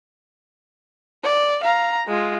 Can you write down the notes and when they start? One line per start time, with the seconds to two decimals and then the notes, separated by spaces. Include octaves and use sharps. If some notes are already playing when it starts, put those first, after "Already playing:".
1.24 D5
1.63 F5 A#5
2.07 G#3 F4